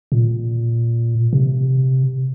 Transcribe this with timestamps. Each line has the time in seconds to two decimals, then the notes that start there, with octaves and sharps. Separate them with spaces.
0.12 A#2
1.33 C3